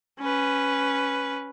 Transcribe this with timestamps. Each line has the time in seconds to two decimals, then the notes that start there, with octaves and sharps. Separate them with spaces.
0.20 C#4 B4